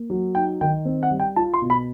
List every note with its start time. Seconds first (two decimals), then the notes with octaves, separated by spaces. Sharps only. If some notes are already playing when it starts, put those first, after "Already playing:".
Already playing: A#3
0.10 F#3
0.35 D#4 G5
0.61 D#3 G5
0.85 C4
1.03 F#5
1.11 G3
1.20 G5
1.36 F4 A5
1.54 C6
1.62 B2
1.70 B5